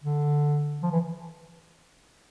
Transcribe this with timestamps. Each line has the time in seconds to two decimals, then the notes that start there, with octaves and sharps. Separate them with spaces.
0.04 D3
0.83 F3
0.92 E3